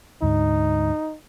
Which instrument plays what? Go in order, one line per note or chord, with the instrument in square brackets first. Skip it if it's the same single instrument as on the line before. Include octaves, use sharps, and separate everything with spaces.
[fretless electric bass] D2 G#2 [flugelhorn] D#4